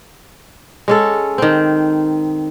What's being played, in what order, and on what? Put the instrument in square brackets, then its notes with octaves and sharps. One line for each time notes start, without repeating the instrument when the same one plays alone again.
[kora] G#3 C#4 A4
D#3 C4